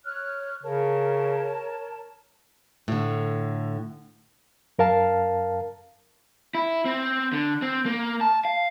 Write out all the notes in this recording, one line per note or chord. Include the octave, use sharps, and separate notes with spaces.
C#5 F6 F#6
C#3 A#4 C#5 A5
A2 D3
F#2 A#4 F5 A5
E4
C4
D3
C4
A#3
A5
F5